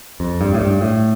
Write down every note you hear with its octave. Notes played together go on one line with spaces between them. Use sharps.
F2
G2
A2
G2
A2